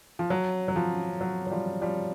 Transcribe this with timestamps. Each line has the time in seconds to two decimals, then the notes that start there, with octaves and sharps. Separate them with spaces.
0.19 F3
0.30 F#3
0.68 F#3
0.76 F3
1.21 F#3
1.47 F#3
1.51 F3 G3
1.81 F3 G3